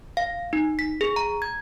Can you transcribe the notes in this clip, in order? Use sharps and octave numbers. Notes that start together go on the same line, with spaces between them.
F5
D#4
B6
G#4
A#5
G#6